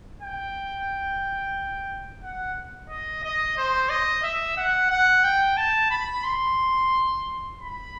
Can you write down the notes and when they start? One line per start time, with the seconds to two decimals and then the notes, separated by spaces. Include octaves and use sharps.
0.23 G5
2.23 F#5
2.90 D#5
3.23 D#5
3.57 C5
3.90 D#5
4.23 E5
4.57 F#5
4.90 F#5
5.24 G5
5.57 A5
5.91 B5
6.24 C6
7.59 B5